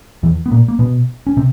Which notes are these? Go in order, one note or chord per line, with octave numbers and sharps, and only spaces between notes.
E2 E3
B3
A#2 A#3
A#3
B2 B3
C#4
C3 C4